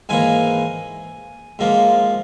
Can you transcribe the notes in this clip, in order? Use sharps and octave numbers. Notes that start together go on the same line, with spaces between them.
G#2 E3 A#3 G#5
G#2 F3 A#3